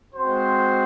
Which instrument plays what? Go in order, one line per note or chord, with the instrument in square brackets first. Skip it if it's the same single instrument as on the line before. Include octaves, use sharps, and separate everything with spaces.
[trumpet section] G#3 C4 F#4 C5